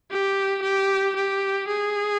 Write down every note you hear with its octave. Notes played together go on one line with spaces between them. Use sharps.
G4
G4
G4
G#4